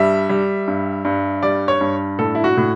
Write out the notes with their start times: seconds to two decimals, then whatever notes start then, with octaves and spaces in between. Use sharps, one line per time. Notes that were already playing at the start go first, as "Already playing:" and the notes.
Already playing: G2 G3 E5
0.30 G3
0.68 G2
1.05 G2
1.43 G3 D5
1.68 C#5
1.81 G2
2.19 A2 A4
2.35 E4
2.44 F#4
2.57 A2